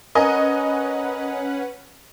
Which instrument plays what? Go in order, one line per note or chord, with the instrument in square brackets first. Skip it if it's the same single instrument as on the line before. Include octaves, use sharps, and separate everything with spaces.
[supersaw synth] C#4 B4 F#5 [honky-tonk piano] A#4 D#5 G#5